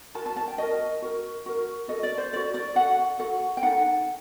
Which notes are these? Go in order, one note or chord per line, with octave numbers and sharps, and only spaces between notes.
F#4 A#4 A5
A5
A5
G5
F#4 A#4 D#5
F#4 A#4
F#4 A#4
F#4 A4 D#5
D5
C5
F#4 A4 D5
D5
F#4 A4 F#5
F#4 A4 F#5
G5
D#4 A4 F#5